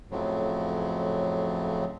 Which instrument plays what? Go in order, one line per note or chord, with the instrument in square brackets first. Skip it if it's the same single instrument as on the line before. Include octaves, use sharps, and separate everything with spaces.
[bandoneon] F2 A2 C#3 F3 F#3